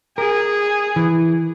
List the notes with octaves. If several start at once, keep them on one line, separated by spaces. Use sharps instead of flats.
G#4 A#4
E3